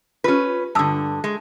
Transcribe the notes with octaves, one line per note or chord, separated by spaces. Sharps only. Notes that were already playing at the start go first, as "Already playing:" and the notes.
C#4 F4 G4 B4
G2 D3 A5 D#6 E6
G#3